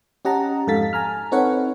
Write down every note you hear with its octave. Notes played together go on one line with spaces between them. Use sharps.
C#4 G4 D#5 F#5 A5 A#5
F2 G#2 A4 F5 A6 B6
G#5 A#5 F6
C4 D#4 A4 B4 C#5 F#5